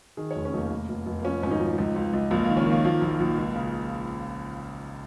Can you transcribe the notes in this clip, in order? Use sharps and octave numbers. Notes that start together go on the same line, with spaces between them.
D#3 G#4
F1 C#5
C#4
F1 A#3
F1
F1
F1
A#3
F3 C#4
G#1 C#4
D#4
F3
C#2
C#2
C#2
A#1 A#3
D#3 A#3
C#4
D#3
A#3
F3 A#3
A#1
A#1
C#2
C#3